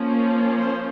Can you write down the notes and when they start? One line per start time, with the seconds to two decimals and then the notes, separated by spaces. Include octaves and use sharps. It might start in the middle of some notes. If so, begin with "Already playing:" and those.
Already playing: F3 A#3 C#4
0.57 C5